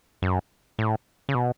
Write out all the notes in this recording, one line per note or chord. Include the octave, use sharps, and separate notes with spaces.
F#2
A2
C#3
B2